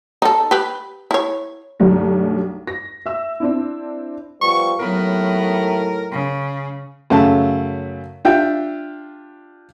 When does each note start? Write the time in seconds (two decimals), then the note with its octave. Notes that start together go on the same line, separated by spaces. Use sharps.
0.22 D#4 A4
0.51 G4 B4
1.11 E4 C#5
1.80 B1 F#2 D3 G3 A3
2.67 A#6
3.06 E5 E6
3.40 C4 D4 E4
4.41 F3 G3 B3 C#6
4.80 D#2 A2 F#3 B3 A#4
6.12 C#3
7.10 F#2 C#3 A3 A5
8.25 D4 F4 G4 E5 G5